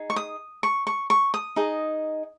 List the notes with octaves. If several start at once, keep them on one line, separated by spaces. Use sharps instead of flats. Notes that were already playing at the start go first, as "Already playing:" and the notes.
Already playing: D#4 G#4
C#6
D#6
C#6
C#6
C#6
D#6
D#4 G#4 D#5